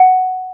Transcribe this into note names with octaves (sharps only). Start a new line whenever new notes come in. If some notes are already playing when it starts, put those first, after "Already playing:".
Already playing: F#5